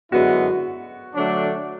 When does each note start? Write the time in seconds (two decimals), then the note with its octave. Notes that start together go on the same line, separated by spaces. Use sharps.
0.11 F#2 D3 G#3 B3 E4 F#4
1.15 D3 F#3 A3 D4